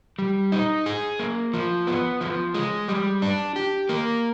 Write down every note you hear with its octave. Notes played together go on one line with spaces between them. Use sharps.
G3
D#4
G#4
A#3
F3
B3
F3
G#3
G3
D4
G4
A#3